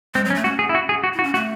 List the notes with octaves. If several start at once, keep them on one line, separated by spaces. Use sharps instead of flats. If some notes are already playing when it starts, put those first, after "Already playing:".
G#3 C4
F#3
C#4
A3
C#4 F#4
G#4
E4
F#4
G#4
F#4
E4
F#4
C#4
A3 F#4